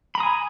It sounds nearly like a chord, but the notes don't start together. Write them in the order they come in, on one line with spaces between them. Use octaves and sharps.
B5 A#5 D#6 G#5